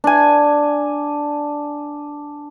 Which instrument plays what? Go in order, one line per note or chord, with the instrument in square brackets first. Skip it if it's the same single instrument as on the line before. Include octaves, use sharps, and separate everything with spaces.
[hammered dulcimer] D4 G#5